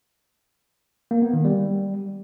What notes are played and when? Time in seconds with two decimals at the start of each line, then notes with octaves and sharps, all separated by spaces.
1.11 A#3
1.22 B3
1.33 D#3
1.45 G3